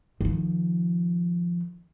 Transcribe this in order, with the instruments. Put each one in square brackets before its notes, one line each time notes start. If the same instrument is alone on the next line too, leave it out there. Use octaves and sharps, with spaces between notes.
[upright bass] D#3 F3